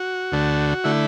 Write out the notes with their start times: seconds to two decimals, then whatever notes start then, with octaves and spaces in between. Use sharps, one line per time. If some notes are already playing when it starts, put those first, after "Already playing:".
Already playing: F#4
0.32 D2 D3 A3
0.84 D3 A3 E4